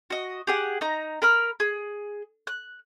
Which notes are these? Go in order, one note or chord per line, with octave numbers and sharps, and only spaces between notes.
F#4 D#5
G4 G#4 F#5
D#4 A#5
A#4 B5 F6
G#4
F#6